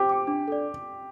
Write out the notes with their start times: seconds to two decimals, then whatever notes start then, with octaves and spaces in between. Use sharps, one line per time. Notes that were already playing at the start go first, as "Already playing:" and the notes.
Already playing: G4 C5
0.09 G5 D6
0.27 D4
0.48 A4 D5